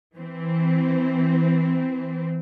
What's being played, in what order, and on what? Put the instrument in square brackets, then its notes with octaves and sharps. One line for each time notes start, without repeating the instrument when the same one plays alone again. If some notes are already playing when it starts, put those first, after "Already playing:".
[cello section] E3 C4